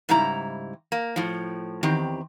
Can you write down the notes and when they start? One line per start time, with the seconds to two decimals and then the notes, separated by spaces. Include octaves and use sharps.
0.09 G#2 C#3 G3 E4 A#5
0.92 A#3
1.16 A2 F3
1.83 E2 D#3 C4 G4